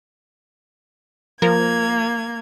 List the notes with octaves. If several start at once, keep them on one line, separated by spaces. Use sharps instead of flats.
F3 A#3 A#4 G#6